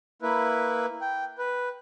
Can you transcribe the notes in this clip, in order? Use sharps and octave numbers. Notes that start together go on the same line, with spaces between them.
A#3 E4 B4
G5
B4